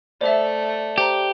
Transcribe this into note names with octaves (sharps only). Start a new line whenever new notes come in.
A3 C5 D5 E5
G4 C5 A#5